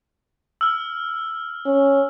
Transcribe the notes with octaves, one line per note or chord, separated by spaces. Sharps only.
E6 F6
C#4